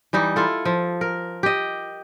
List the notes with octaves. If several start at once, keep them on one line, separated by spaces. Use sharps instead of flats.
E3 G3 D#4
E4 F4 A4
F3
A#4
G4 D#5